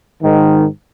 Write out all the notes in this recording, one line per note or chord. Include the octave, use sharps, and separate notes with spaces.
G#2 D#3